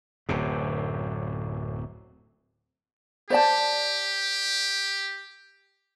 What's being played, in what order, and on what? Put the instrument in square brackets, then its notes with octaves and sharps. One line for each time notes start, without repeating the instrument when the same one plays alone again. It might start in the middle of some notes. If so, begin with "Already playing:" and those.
[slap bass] D1 F#2 C3
[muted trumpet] G4 [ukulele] C5 D5 A5